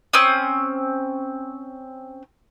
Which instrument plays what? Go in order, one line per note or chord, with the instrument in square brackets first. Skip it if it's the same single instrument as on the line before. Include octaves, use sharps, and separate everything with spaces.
[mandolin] C4 C#4 D#6